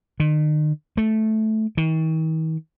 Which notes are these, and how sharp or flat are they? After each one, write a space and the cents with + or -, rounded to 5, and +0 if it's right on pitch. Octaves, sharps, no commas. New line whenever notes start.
D#3 -40
A3 -10
D#3 +45